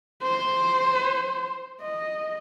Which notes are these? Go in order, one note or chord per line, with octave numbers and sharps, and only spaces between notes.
C5
D#5